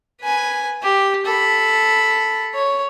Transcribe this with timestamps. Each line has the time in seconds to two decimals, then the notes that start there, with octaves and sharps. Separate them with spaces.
0.21 B4 G#5
0.82 G4
1.25 A4 B5
2.54 C#5